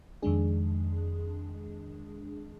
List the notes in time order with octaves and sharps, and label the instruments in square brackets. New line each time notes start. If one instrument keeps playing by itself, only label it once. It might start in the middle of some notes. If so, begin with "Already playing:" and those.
[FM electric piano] F2 D#3 G#3 D4 G#4